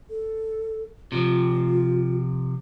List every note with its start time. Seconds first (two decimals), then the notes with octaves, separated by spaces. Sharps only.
0.10 A4
1.12 C3 F3 F4